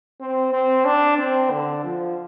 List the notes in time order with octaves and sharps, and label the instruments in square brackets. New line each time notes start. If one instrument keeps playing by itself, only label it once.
[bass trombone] C4
C4
D4
C4
D3
F3